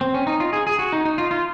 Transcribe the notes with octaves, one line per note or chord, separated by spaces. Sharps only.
C4
C#4
D#4
F4
G#4
G#4
F#4
D#4
D#4
F4
F4